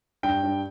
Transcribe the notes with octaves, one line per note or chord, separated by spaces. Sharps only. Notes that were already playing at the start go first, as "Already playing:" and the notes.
G2 G5
G2